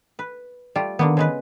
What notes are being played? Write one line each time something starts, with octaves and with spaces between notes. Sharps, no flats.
B4
G3 A3 F4
D3 D#3 A#3 B3
C#3 G#3 B4